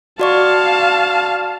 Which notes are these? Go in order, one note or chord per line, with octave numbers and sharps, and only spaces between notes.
F#4 D5 F5 A5 C#6